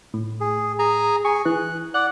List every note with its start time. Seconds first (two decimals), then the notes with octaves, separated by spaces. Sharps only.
0.14 A2
0.40 G#4
0.79 G#4 G#5 A#5
1.25 G#4 G#5 C#6
1.45 E3 F#6
1.94 D5 F#5 F#6